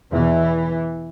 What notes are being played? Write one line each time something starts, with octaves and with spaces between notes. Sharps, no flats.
E2 B2 E3